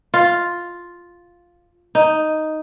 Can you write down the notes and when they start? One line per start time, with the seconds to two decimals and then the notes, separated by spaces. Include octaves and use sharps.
0.14 F4
1.95 D#4